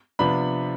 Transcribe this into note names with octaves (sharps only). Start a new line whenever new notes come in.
C3 F3 B3 D4 B5